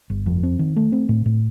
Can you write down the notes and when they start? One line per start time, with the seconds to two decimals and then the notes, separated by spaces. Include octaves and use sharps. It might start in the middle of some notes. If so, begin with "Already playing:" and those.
0.10 G1
0.26 F2
0.43 C4
0.59 D#3
0.76 A3
0.92 C4
1.09 A2
1.26 A2